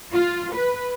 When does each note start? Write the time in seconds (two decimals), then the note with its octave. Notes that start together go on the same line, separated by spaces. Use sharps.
0.13 F4
0.54 B4